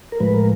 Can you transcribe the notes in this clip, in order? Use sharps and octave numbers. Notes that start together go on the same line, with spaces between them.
A#4
A2 F3 G#3 B4
A#4